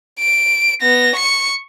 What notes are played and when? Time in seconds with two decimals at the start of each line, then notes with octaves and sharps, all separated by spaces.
0.19 D7
0.81 B3 A#6
1.15 C#6 C#7